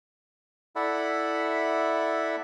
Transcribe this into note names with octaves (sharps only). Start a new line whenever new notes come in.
E4 A4 D5 E5 F#5 B5